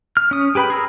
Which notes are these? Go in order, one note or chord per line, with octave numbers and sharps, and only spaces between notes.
F6
C#4 D#6
G4 G#4 B4 G5 B5
G#4 A#5 E6